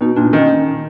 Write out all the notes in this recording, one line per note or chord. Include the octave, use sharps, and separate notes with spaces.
B2 D#4
A#2 D4
D#3 C#4